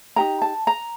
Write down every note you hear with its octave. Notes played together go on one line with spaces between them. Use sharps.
D#4 G4 A#4 A#5
A5
A#5